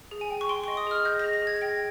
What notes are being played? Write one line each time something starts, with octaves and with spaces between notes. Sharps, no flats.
G#4
G#5
G5
C#6
G5 C6
C#6
D#5
D#6
G#4 F6
D#5 G6
A#6
G#4
A#6
G#4 G#6
G#6
G5 A#6